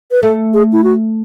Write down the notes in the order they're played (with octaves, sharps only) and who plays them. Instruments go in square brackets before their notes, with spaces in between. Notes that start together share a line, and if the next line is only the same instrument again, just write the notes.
[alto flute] B4
[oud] A3 [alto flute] A4
[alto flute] G#4
E4
F#4